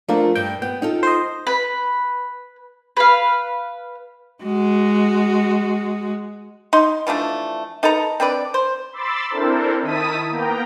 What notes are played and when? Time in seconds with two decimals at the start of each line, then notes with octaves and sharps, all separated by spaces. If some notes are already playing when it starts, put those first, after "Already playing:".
0.09 F3 A3 A#3 D4 F4
0.35 G2 G5
0.62 B3 G5
0.82 D#4 F4 A4
1.03 C5 D#5
1.47 B4
2.97 B4 F5
4.43 G#3 F#4
6.73 D#4 C6
7.07 E3 F3 A3 D4
7.83 D#4 A4 B4 A#5
8.20 C4 D4 B4 D5
8.54 C5
8.92 B5 C6 D6 E6 A6
9.30 C4 D4 E4 A4 A#4 C5
9.82 D#3 E4 A5 D#6 B6 D#7
10.30 A#3 B3 G5 A#5